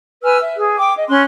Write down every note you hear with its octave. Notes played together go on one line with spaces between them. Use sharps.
B4 G#5 E6 F6
E5
G#4
G5 D6
D#5
C#4 C6 F#6